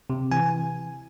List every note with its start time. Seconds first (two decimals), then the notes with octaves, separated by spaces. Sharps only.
0.10 C3
0.32 E3 G#5